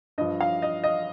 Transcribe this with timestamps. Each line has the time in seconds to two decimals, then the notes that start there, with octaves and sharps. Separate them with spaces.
0.18 G2 F3 D#5
0.41 F5
0.62 D#5
0.84 D#5